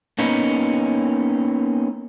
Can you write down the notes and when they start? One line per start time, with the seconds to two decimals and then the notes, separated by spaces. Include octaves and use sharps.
0.19 A#3 B3 C#4 D#4